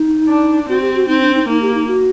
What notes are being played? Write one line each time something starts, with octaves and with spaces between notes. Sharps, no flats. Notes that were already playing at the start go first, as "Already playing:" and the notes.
Already playing: D#4
D4
C4 F#4
G4
F#4
C4 D#4
D4
D#4
A#3 D#4
G4
D#4
F#4